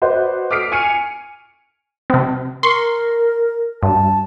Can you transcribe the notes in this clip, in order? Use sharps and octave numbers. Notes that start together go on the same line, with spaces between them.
F#4 B4 C5 D5 D#5
D6 D#6 F6 B6 C7 D7
G#5 C#6 F6 C#7 D#7 F7
C3 C4
A#4 C6 C#6
G2 A5